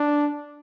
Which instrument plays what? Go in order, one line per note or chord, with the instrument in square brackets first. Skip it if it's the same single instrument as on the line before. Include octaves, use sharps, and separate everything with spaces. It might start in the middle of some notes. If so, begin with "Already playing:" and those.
Already playing: [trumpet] D4